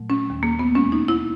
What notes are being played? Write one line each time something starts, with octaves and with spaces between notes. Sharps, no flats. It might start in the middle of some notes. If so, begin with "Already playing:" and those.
Already playing: A#2 F#3 A3
C#4
D#2 D#3 G3
A#3
B3
E2 B2 G#3 C#4
D#4
E4